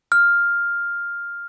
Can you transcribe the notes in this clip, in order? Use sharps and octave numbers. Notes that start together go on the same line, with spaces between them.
F6